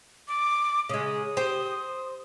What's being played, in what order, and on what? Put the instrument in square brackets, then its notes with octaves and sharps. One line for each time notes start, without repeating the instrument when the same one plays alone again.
[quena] D6
[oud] C#3 G#3 [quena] D#6
[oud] G4 [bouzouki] C5